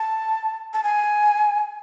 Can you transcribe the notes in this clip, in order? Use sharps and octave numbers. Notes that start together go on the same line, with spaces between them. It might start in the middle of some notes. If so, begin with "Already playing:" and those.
Already playing: A5
A5
G#5